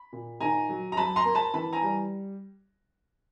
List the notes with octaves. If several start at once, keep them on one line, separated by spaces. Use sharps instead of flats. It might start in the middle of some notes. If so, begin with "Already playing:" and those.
Already playing: B5
A#2
D#3 G#5 A#5
F#3
A#5
F#2 A5 B5
A#5 C6
A#3
A5 B5
E3 A5 B5
G#5 A#5
G3